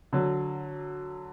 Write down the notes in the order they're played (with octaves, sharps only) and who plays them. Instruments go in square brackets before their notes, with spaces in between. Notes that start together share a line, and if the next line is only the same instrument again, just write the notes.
[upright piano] D3 F#3